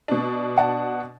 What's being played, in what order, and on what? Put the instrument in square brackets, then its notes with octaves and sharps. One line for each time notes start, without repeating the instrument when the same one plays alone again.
[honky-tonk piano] B2 D4
[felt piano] D5 F#5 A5